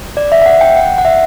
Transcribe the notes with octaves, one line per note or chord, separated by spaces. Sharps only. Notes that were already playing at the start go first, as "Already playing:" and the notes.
D5
E5
E5
F#5
G5
F#5
F#5
E5